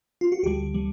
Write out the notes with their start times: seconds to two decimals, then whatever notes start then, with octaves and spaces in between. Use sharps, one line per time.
0.21 F4
0.32 F#4
0.43 D2 D3 G3 G4
0.74 D3 G3